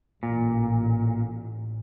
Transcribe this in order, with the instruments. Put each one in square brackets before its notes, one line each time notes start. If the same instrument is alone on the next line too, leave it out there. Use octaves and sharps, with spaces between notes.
[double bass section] A1 [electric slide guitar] A#2